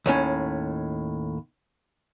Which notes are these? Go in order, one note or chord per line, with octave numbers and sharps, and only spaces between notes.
D#2 A2 C#4